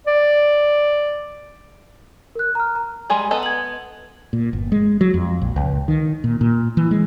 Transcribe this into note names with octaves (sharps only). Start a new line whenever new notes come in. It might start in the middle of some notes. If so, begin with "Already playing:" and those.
D5
A#4 F#6
A#5 F6
A#5
G3 G#3 G#4
B3 A4 D#5
G#6 F#7
A#2
G1
G#3
F#3
F2
A#1
C#2
D#3
A#2
A#2
E3
G#3